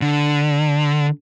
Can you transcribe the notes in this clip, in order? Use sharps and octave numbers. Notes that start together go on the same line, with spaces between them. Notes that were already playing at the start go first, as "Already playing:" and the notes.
D3